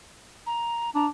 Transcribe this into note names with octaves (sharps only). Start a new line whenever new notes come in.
A#5
D4 A#5